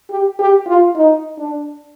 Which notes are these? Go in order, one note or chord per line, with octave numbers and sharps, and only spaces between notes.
G4
G4
F4
D#4
D4